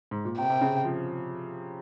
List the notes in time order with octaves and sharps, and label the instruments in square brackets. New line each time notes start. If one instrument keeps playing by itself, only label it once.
[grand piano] G#2
A#2
[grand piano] C3 [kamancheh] G5
[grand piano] C3
C#3
F3